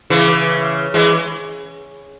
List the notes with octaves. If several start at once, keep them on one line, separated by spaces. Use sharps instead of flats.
C#3 E3
E3 G#3